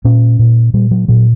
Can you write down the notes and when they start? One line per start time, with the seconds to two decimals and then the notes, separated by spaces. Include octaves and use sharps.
0.05 A#2 C#4
0.39 A#2
0.74 A#2 G3
0.91 F#3
1.08 A#2 F#3